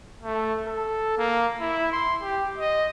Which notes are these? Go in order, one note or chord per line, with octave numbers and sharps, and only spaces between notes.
A3
A4
A#3
E4
C6
G4
D#5